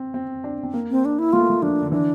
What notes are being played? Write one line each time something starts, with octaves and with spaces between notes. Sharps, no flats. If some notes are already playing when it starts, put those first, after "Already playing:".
Already playing: C4
C4
D4
C4
A#3
C4
D4
E4
A3 F4
A#3
A3
F3 D4
D3
E3 D4